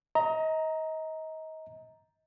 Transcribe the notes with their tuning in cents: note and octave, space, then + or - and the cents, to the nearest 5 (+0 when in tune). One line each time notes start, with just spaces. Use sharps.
D#5 +30 A#5 +0